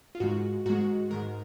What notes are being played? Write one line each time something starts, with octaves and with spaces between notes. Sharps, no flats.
F4
G#2 D#3 G#3 F#4
G#2 D#3 G#3 F#4
G#2 D#3 G#3 A#4